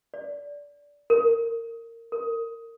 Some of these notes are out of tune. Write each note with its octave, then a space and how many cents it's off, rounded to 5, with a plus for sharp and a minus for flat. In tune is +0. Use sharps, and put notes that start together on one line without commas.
D5 -20
A#4 -20
A#4 -25